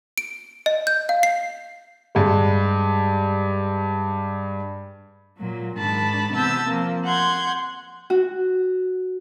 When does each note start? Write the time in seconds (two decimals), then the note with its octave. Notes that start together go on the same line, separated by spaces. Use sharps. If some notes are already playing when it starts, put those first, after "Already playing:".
0.18 D7
0.66 D#5
0.87 G6
1.09 F5
1.23 C7
2.15 G2 G#3
5.38 A#2 F#3
5.77 G#2 D#3 D4 A5 B5
6.32 C3 E3 B3 A5 E6 G6
6.67 F3 A#3 C4
7.05 F#5 C6 G6 G#6
8.10 F#4